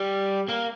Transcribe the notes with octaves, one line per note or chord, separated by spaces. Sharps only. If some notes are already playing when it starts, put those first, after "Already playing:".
Already playing: G3
A#3